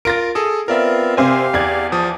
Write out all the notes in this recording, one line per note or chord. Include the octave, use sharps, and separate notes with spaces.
F4 A#4 A6 A#6 D7
G#4 A4 D#6
B3 C4 F4 A#4 D5 E5
C3 G4 C5 F5 G#5
E2 D5 G#6
F3 A5 D#6